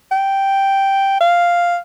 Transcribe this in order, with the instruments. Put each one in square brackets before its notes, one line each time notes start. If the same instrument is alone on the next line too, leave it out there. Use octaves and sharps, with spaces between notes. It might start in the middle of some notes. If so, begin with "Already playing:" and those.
[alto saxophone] G5
F5